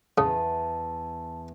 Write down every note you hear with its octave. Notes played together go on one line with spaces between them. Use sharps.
E2 C#3 A5